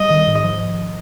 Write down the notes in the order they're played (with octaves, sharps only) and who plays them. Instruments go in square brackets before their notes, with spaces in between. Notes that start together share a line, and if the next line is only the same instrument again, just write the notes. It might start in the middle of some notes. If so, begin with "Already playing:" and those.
Already playing: [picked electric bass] G3 [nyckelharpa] D#5
[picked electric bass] D#3
G#2
F3